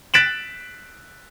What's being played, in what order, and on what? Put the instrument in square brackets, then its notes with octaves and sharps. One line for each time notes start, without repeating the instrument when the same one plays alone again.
[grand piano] F#6 A6 B6 D7 E7 F#7